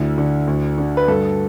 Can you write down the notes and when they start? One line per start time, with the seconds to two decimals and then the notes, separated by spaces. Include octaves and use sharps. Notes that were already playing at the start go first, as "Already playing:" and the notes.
Already playing: D2 D3 E4
0.18 D3
0.47 D2
0.78 D3
0.97 B4
1.08 G2 A4